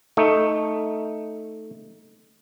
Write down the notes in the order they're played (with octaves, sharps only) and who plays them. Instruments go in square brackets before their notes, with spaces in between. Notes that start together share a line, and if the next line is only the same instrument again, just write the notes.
[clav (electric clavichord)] A3 D#4